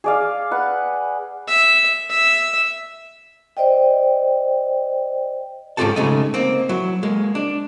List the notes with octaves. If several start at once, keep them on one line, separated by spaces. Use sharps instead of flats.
G#4 D5 F5
B4 F#5
E5
E5
C5 D5 D#5 G5
G#2 C#4 F4 G4 A4 A5
C#3 G#3 A3 D#4
A#3 C4
F#3 E4
G#3 A#3
D4